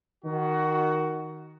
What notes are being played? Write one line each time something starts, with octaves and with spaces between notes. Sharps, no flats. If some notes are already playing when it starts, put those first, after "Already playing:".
D#3 F#4